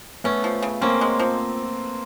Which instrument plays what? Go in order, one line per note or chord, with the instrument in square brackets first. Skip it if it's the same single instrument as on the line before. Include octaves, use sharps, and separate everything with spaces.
[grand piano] A3 B3 [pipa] C#4
[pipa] F3
C#3
[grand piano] A#3 C4 [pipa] C#4
[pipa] G#3
F3